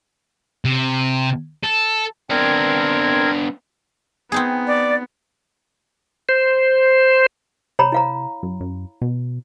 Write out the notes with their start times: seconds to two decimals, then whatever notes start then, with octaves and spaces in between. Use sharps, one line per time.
0.65 C3
1.64 A4
2.30 B3 C4 D4 A#4 G#6
4.32 B3 C4 D#4 G#4
4.66 D5
6.29 C5
7.79 C3 C#5 A#5 B5
7.92 E4 F5 A#5
8.43 F#2
8.60 F#2
9.01 B2